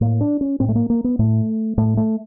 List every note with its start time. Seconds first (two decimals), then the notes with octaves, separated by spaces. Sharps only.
0.01 A2 A#3
0.21 D4
0.41 C#4
0.60 A2 C4
0.69 A3
0.75 A#3
0.90 A#3
1.04 B3
1.19 A2 A3
1.77 A2 A3
1.97 A3